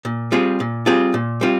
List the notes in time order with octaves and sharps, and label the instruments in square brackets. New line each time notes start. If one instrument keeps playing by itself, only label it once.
[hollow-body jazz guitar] A#2
G3 C4 F4 G#4
A#2
G3 C4 F4 G#4
A#2
G3 C4 F4